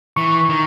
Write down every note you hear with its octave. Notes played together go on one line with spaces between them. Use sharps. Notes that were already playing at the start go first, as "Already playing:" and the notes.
E3 C#6
D#3